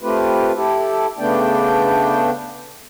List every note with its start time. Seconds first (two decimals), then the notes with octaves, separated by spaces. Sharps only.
0.01 A3 C4 F4 G4 B4
0.55 E4 G4 A4
1.19 C#3 A3 B3 D4 D5 G5